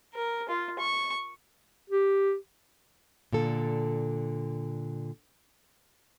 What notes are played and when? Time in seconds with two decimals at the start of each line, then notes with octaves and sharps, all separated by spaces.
0.14 A#4
0.49 F4
0.79 C#6
1.90 G4
3.33 A#2 D3 A4